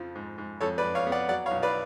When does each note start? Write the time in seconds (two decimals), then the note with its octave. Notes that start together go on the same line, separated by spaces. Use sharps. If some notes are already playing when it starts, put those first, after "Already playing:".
Already playing: F2 C#3 F3
0.15 G#2
0.38 G#2
0.61 F2 A4 C#5
0.78 B4 D5
0.83 F2
0.95 C#5 F5
1.07 B3
1.12 D5 F#5
1.29 F#3 D5 F#5
1.46 C#5 F5
1.51 B1
1.63 B4 D5